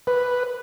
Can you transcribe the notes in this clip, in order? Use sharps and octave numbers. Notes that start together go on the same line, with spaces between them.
B4